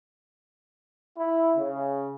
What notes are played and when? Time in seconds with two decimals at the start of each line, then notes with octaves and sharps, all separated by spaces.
1.18 E4
1.56 C#3